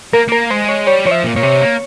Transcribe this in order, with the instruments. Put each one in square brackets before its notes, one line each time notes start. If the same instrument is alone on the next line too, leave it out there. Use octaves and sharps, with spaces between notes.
[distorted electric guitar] A#3 [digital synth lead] A#4
[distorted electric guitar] A#3 [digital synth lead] A#4
[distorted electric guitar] G#3 [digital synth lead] C5
[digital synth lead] C#5
[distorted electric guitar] G3 [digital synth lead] C#5
[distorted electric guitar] F3 [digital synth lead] C#5
[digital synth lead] E5
[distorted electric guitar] A#2
[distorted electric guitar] A#2 [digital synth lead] C#5
[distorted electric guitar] C3
A#3